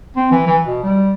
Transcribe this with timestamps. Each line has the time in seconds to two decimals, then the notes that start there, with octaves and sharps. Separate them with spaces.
0.16 C4
0.31 E3
0.47 E3
0.66 B2
0.83 G3